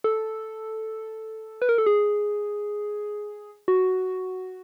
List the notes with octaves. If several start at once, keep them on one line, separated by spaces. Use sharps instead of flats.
A4
B4
A#4
A4
G#4
F#4